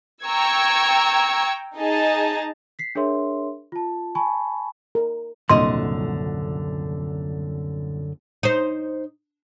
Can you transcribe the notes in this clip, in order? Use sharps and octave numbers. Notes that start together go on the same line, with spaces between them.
G5 A#5 C#6 E6 G#6
D#4 G#4 D#5 A5
B6 C7
D4 G#4 A#4 C#5 E5 C6
F4 A5
G#5 A5 B5 C#6
A#4
D#1 C2 F#2 A#2 D3 D#5 C6
D#4 C5